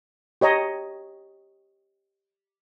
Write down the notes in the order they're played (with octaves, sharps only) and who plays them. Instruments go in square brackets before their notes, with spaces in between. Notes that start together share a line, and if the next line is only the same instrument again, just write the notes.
[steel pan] G4 C#5 D#5 A#5